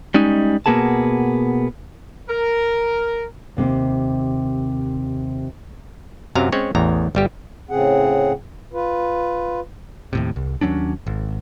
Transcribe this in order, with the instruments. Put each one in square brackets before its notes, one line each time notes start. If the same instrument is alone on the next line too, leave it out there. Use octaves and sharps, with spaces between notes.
[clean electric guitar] G3 G#3 C#4 D#4
B2 G#3 A#3 B3 G#4 A5
[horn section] A#4
[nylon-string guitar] D#2 C3 A#3
[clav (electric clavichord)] F#2 C3 F#3 F5 A#5
G#3 C4 C#4 C#5
A1 E2 A#5
G1 G3 G4
[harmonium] A2 C#3 C4 G#4 F#5
F4 B4
[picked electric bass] D#2 A2 C3
C2
D#2 F#3 C#4 D4
G#1